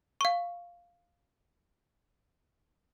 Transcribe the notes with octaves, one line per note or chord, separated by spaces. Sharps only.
F5 C#6